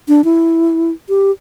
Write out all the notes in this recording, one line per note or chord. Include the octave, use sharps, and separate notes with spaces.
D4
E4
G4